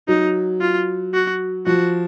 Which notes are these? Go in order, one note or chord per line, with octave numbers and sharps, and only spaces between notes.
F#3 D#4
F4
F#4
F3 F#4